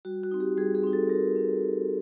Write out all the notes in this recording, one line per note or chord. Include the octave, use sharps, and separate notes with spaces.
G3 F#4
F#4
C4 D#4
G4
G3 G#4
G#4
C4 D#4
A4
G3 A#4
C4 D#4
G3